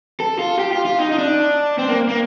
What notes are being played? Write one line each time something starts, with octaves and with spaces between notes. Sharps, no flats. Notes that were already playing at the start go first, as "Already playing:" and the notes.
A4
F4
G4
F4
F4
D#4
D#4
D4
C4
A#3
A#3